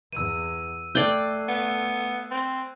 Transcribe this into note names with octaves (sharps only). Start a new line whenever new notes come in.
E2 E6 D#7
A3 D5 G5 F#6 G#6 C7
B3
C4